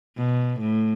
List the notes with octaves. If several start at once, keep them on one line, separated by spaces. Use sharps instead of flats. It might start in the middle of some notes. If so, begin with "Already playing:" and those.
B2
A2